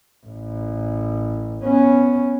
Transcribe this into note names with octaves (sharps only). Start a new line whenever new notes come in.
A1
B3 C#4